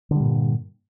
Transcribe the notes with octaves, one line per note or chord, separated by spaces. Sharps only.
G2 A#2 D3 G3